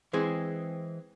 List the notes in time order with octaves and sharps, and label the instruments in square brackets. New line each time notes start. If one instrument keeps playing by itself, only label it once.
[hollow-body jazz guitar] E3 G#3 C4 G#4